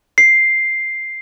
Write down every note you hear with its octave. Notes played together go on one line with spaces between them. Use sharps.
C7